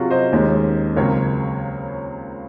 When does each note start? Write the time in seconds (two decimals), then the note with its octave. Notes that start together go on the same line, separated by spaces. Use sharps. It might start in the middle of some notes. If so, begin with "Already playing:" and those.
Already playing: C3 F#3 C#4 F4 F#4 G#4
0.10 C5 D#5
0.32 D#2 D#3 G#3 C#4
0.96 C#2 C#3 F#3 C4 A#4 C#5